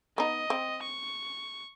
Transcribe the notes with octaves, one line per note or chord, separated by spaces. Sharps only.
B3 D#4 D#5
C4
C#6